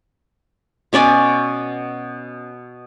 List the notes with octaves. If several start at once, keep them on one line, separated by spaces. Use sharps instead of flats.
B2 C#4 D5 G#5